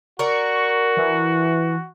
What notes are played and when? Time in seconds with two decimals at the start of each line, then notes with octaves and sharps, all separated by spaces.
0.19 F#4 A#4 D5 C#6
0.97 E3